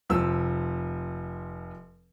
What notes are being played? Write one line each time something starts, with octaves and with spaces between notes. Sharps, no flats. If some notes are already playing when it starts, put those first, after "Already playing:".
F1 F3 E6